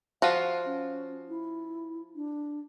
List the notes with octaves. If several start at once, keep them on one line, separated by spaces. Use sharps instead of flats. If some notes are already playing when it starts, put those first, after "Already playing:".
F3 F4 F#4 F5
C#4
E4
D4